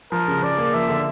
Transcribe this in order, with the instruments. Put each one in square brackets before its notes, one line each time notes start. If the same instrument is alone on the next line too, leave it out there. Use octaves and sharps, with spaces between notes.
[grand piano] F3 [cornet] A#4
[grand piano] C#3
[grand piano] C#3 [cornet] D5
[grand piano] A#3
[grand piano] F3 [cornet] E5
[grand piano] D3